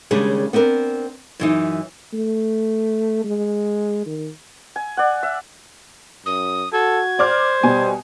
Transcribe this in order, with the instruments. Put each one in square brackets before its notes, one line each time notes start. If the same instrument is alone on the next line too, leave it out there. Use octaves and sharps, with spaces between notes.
[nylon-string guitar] D#2 C#3 G3 G#3 D4 G#4
B3 C4 D4 A#4
F#2 E3 D#4
[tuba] A3
G#3
D#3
[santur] G#5
D5 F#5
E5
[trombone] F#2 [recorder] D#6
[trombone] F#4 [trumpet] A4 [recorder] G#6
[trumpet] C5 [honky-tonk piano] D5 D6 F6
[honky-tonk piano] B2 G#5 [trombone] G3